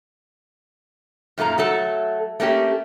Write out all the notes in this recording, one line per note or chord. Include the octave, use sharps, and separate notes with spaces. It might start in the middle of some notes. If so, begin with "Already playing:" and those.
F#2 A#2 A3 A#3 A#5
F#3 A3 A4
A3 A#3 C#4 G4